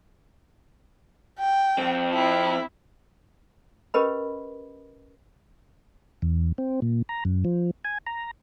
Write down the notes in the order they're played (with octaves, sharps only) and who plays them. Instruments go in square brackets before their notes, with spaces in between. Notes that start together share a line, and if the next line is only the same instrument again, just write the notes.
[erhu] G5
[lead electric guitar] F2 C4
[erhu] E4
[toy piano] C#4 G4 A#4 B4 D#5 B5
[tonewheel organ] E2
C4
A#2
A#5
F#2
F3
G#5
A#5